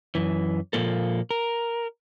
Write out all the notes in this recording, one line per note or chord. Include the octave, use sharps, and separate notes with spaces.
F#2 E3
A#2 C#3 F3 A#3 A4
A#4